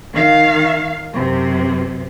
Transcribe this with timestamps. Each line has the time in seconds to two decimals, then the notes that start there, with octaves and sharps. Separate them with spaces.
0.13 D#3 F5
1.13 F#2 C3